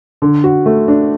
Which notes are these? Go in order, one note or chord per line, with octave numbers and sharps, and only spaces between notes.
D3
F#4
A3
D4